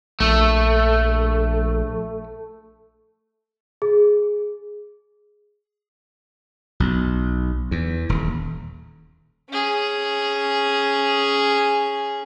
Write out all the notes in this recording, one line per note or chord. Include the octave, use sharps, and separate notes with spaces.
A#1 A3
G#4
B1
E2
D#1
C#4 G#4